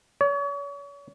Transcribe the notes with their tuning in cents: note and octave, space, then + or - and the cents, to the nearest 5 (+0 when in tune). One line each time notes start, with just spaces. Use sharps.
C#5 +40